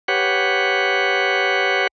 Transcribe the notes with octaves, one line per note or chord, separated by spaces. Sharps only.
G4 B4 C#5 F#5